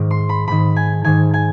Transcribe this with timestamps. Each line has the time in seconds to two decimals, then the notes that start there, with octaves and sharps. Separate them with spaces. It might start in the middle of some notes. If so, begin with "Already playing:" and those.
Already playing: G#2 D#3
0.11 C6
0.29 B5
0.48 G#2 D#3 B5
0.76 G#5
1.04 G#2 D#3 G#5
1.34 G#5